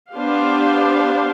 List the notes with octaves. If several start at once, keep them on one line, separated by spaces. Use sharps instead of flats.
B3 D4 G4 C5 F5